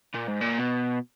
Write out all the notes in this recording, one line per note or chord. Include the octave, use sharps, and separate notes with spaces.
A#2
G#2
A#2
B2